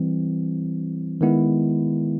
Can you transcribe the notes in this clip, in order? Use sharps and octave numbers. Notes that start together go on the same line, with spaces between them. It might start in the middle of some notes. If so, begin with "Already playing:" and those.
Already playing: E3 G3 C4
D#3 G#3 B3 E4